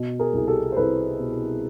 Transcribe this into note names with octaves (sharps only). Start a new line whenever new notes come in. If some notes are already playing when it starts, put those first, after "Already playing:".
Already playing: B2
G#4 A#4
C2 G#4
G4 A4
C5
C2 A4 B4
B2